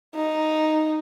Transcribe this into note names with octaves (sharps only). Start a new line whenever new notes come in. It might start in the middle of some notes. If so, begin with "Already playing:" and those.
D#4